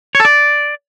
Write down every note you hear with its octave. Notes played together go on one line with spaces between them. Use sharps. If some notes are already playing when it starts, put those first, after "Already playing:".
C#5
A4
D5